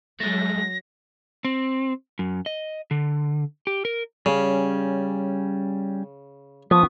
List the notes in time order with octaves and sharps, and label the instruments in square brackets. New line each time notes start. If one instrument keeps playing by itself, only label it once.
[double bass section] F#3 [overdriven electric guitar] G#3 A3 [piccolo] A#6
[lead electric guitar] C4
F#2
D#5
D3
G4
A#4
[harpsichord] C#3 [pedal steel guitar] G3 C#4
[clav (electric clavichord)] F3 [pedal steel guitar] B3 F4 C#6 [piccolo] D#6